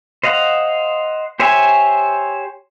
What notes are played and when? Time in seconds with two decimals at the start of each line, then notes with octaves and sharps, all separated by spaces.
0.24 C5 D#5 F5 F#5
1.40 G4 C5 C#5 E5 G#5